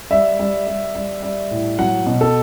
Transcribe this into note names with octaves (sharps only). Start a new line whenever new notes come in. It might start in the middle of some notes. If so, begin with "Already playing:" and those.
G3 E5
G3
G3
G3
G3
A2
F#3 F#5
B2
A4